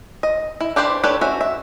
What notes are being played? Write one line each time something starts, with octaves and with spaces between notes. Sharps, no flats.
D#5
E4
D4 G4 B4 C5 D5
D4 G4 A4 B4 C#5
C#4 F#4 E5
E5